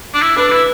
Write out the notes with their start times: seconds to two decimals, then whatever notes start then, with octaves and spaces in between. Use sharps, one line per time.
0.14 D4
0.22 E4
0.36 D4 B4
0.48 D4
0.51 E4 B4